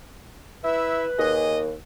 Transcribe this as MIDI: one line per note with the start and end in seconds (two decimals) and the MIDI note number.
0.64 1.06 64
0.64 1.44 71
0.64 1.06 76
1.18 1.73 39
1.18 1.57 68
1.18 1.57 75